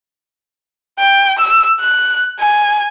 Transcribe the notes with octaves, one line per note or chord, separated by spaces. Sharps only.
G5
E6
F#6
G#5